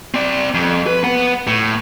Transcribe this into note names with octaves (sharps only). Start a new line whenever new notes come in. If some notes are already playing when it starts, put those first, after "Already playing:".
C4 D5
F2
B4
B3 F#5
A2